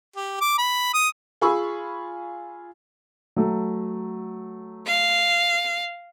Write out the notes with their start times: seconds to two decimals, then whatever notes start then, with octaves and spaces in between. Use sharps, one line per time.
0.16 G4
0.41 D6
0.58 B5
0.94 D#6
1.41 F4 G#4 G#5 B5 C#6 E6
3.36 F#3 A3
4.86 F5